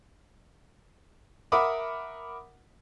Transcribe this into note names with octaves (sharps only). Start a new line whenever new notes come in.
A#4 E5 F#5 B5 D6 D#6